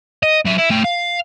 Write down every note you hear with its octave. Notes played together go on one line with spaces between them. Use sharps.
D#5
F#3 E5
E4
A3 G5
F5